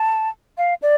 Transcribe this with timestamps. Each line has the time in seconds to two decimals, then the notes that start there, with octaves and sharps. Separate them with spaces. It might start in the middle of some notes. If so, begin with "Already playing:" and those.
Already playing: A5
0.58 F5
0.82 D5